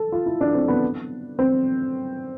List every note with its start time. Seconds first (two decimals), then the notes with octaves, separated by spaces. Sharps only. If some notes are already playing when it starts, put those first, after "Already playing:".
Already playing: A4
0.12 F4
0.26 E4
0.41 D4
0.54 C4
0.68 B3
1.39 C4